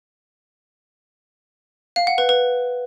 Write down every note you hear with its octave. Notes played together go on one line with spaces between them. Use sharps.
F5
F#5
B4
B4